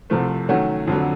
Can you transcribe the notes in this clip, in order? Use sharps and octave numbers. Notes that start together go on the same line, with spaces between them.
C2 C3 F3 A3
D#3 F#3 A3 C#4 F#4
F2 D3 F#3